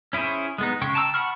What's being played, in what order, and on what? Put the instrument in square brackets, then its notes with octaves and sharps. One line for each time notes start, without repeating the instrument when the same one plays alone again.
[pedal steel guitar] C#4 E4 G#4 C5 C#5
G#3 B3 D#4
C#3 G#3 G5 C#6
G5 A5 A#5 C#6 E6
F#5 A5 B5 C#6 F6